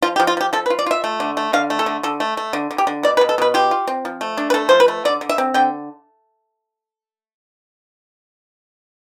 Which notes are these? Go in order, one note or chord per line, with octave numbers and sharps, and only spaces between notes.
F3 F4
G4
F3
F4
F3 G4
F3 A4
B4
F4
D5
F4 E5
A3
D3
A3
D3 F5
A3
A4
D3
D3 A4
A3
A3
D3
D3
G4
D3
B2 D5
B4
B2
A4
B2 B4
F4 G4
F4
C4
F3
A3
D4
B4
A3 A4
F3 C5
B4
A3
D3 D5
D3
E5
C4
D3 G5